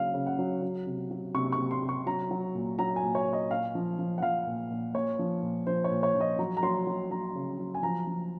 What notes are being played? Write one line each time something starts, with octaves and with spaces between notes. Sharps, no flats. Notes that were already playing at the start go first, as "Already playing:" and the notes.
Already playing: C#3 F#3 F5
C#3
F#5
F#3
F#3
C3
F#3
C3 C#6
C#6
C3
C6
C3
C#6
F#3 A#5
F#3
A#2
F#3 A#5
G#5
A#2
C#5
A#2
D#5
A#2 F5
F3
F3
F#5
F3 F5
A#2
A#2
A#2 C#5
F3
A#2
F3 C5
C#5
A#2
C#5
F3
D#5
F#3 A#5
A#5
F#3 C6
F#3
F#3 A#5
C#3
F#3
G#5
F3 A#5
F3